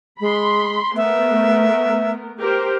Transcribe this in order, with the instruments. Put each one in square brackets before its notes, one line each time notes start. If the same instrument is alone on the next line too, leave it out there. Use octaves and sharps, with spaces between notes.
[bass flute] G#3 [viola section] B5 C6
[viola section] A3 B3 A#4 [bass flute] E5
[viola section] G4 A#4 C5